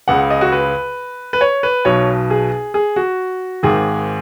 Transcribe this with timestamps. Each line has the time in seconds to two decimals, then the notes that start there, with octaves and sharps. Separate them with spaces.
0.08 C#2 C#3 F#5
0.30 D#5
0.41 F#4
0.52 B4
1.33 B4
1.41 C#5
1.63 B4
1.85 B1 B2 C#5
2.30 G#4
2.74 G#4
2.96 F#4
3.63 G#1 G#2 D#3 G#4